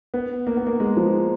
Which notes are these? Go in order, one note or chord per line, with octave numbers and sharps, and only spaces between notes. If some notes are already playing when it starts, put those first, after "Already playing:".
B3
A#3
B3
A#3
G#3
F3